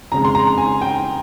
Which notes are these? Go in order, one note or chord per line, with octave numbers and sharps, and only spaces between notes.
F2 C#3 G#3 A#5
C6
A#5
G#5
G5